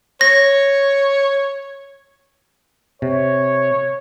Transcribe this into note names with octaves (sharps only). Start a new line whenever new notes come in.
C#5 A#6
C3 C#5